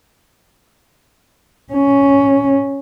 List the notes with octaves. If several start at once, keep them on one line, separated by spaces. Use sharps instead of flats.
C#4